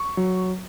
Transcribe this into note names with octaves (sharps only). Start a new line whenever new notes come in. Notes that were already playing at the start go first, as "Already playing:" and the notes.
Already playing: C#6
F#3